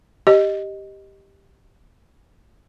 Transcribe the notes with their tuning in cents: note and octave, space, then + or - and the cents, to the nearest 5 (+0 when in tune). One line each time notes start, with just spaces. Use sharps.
G4 +0 D#5 +0